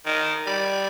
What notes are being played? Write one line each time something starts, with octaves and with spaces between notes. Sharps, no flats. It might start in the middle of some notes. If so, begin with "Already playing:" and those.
D#3
G3